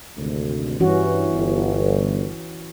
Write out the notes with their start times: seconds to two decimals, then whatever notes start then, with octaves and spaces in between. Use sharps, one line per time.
0.17 G#1 D2 C3
0.80 G2 E3 C#4 F#4
1.33 G1